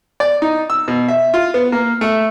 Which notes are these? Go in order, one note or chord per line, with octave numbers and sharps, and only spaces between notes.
D5
D#4
E6
B2
E5
F4
B3
A#3
A3